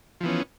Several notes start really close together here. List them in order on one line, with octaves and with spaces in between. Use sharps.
F3 E3 B3 C#4